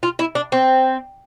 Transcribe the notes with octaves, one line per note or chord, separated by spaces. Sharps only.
F4
E4
D4
C4